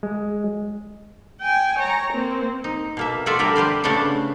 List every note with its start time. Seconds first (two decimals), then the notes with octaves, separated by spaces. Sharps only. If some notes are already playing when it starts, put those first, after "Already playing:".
0.03 G#3
1.41 G5 G#5
1.79 C#5 A#5
2.13 A#3 C4
2.64 D#4
2.97 B2 A#3 E5
3.26 F4 F#4 A4 D5 E5
3.39 D3 G3 A#4 E5
3.56 G4 B4 C5 D5
3.84 C#3 A3 B3 D4 E4 A4